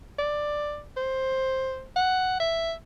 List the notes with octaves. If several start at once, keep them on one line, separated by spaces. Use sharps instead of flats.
D5
C5
F#5
E5